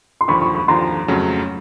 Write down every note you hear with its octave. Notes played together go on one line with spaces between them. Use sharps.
C6
D#2 D3 F3 B5 C#6
B5 C#6
B5 C#6
D#2 D3 F3 A#5 C6
F2 C#3 F#3 A3 C#4